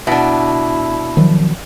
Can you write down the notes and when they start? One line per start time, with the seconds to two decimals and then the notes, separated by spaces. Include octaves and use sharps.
0.07 B2 D4 E4
1.17 D#3 F3 F#3